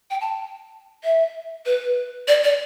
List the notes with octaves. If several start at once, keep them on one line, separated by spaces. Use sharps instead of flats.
G5
A5
E5
B4
D5
D5